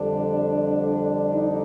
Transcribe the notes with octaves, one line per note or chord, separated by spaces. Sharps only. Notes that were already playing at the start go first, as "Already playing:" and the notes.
Already playing: F2 D3 G3 D4
D#4